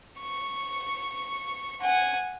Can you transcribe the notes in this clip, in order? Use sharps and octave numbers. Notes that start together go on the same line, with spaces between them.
C#6
F#5 G#5